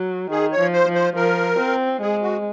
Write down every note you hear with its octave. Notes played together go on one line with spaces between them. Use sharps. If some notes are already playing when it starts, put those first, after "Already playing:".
Already playing: F#3
D#3 G#4
C#5
F3
C5
F3
C5
F3 A#4
C4
G#3 G#4
F#4